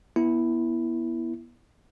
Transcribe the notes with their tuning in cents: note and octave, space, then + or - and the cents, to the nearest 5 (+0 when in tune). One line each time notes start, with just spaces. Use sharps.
B3 -25 E4 +0